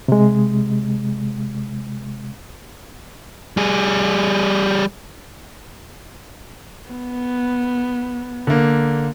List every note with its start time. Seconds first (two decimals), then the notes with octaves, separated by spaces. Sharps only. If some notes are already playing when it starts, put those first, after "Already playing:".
0.08 C3 G#3
3.57 G3 G#4
6.90 B3
8.47 D3 A#3